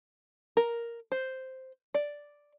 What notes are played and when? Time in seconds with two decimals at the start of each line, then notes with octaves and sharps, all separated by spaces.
0.57 A#4
1.12 C5
1.94 D5